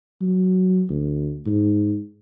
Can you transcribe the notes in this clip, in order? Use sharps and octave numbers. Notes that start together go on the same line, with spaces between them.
F#3
D2
G#2